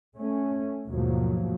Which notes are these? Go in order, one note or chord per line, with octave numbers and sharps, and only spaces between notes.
A3 C#4
D#2 G#2 B2 F3 F#3 A#3